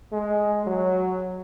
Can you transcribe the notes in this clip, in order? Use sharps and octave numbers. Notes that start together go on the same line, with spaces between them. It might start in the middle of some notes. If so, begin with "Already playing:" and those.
G#3
F#3